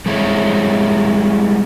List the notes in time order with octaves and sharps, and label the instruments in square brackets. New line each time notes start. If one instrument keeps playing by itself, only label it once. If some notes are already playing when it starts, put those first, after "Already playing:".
[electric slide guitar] G3 G#3 C4 E4 C#5